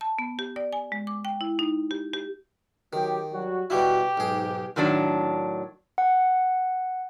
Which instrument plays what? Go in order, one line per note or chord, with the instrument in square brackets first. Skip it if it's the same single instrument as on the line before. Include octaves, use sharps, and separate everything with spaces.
[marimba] A5
B3
G4
D5
G#5
G#3
D6
G5
E4
D#4
G4
G4
[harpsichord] D#3 [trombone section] F#3 G4
[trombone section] F#3 G3 F#4
[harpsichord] B2 G3 E4 [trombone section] F#4 [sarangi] G4
[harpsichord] B1 G#4 [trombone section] G#2
[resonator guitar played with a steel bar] A2 D#3 F#3 D4
[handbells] F#5